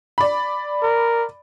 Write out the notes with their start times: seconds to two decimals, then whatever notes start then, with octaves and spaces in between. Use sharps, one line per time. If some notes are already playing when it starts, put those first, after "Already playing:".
0.18 D5 B5
0.82 A#4